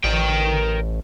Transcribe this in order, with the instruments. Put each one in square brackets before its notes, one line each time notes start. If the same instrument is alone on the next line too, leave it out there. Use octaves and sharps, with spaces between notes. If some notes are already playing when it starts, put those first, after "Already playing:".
[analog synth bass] A1 [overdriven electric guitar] A#4 G5